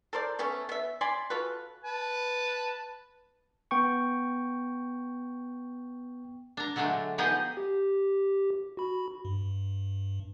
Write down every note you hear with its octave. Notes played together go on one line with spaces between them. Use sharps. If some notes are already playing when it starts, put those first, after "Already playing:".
A4 A#4 C5 D5
A3 B3 C#4 A4
B3 E5
D5 G#5 B5 C6
F4 F#4 A4 B4
B4 A5
B3 G5 C#6
D4 A#5
D3 F#3 G#3 A3 D4
F3 B3 D#4 G4 G#4 D#5
G4
F#4 B5
G2